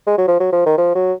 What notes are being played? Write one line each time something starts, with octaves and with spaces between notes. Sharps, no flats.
G#3
F#3
F3
F#3
F3
D#3
F3
F#3